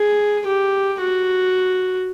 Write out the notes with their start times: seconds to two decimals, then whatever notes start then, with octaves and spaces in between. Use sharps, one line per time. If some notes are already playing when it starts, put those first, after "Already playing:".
Already playing: G#4
0.46 G4
1.00 F#4